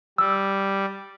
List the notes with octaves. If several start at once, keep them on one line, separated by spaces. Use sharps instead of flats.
G3 E6